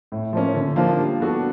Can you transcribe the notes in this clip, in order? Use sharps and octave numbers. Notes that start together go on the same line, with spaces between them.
A2
F3 A#3 C#4
D3
F3 A#3 D4 F4
G3
B3 D4 F#4 A4